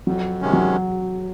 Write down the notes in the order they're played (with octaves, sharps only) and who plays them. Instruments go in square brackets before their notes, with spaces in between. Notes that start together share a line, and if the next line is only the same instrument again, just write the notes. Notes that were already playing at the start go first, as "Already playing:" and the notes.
[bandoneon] F2 [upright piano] F#3
[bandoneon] C3 D#3 G#3 C#4
[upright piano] F#3